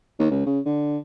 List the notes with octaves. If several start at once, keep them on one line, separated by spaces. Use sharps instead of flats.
D#2
C#2
C#3
D3